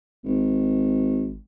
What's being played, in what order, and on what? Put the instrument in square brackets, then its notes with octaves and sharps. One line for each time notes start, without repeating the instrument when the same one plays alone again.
[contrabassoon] G#1